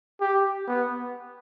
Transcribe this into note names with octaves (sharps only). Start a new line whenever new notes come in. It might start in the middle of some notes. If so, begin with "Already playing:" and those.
G4
B3